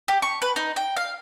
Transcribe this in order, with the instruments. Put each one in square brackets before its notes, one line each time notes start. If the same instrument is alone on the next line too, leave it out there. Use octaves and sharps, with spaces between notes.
[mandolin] G4
C#6
B4
D#4
G5
F5